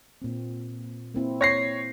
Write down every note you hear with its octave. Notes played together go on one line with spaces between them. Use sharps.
A#2 C4
A#3 C4 E4
C#5 A#6 C7